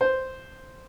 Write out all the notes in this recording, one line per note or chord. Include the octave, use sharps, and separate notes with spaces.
C5